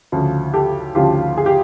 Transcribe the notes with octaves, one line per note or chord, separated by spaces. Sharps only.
D2 C#3 F3
G4 A4
D2 C#3 F3 F4 G4
G#4
G4